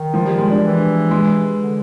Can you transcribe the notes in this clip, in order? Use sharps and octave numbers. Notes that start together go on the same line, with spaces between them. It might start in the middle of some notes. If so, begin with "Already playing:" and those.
Already playing: D#3
F3
G3
G#3
D4
E3
G#3
D3